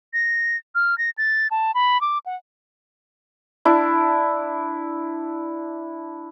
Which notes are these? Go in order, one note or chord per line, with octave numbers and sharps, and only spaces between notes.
A#6
F6
A#6
A6
A5
B5
D6
F#5
D4 E4